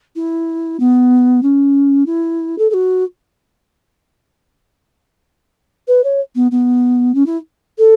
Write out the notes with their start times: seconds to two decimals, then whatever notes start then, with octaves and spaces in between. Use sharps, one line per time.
0.16 E4
0.80 B3
1.43 C#4
2.06 E4
2.58 A4
2.70 A4
2.74 F#4
5.88 B4
6.04 C#5
6.35 B3
6.51 B3
7.14 C#4
7.26 E4
7.78 A4